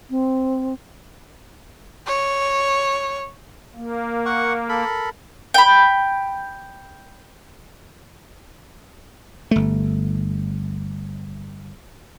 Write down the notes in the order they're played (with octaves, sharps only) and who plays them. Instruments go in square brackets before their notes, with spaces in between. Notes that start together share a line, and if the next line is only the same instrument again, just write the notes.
[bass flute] C4
[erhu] C#5
[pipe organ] A#3
[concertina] F#5 C#6
A4 A#4 B5
[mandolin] G5 B5
[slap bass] G1 A3